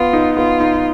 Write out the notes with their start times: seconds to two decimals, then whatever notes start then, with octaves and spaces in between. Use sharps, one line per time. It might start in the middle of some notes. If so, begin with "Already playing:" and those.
Already playing: B3 F4
0.13 D#4
0.37 B3 F4
0.60 D#4